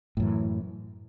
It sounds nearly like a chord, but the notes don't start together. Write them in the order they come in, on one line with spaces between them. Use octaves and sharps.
A2 F#2 E3